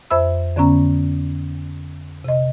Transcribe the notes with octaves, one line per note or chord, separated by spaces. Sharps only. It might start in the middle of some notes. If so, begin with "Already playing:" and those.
F2 C5 E5 B5 E6
F2 D3 B3 C#4 A#5
C3 D#5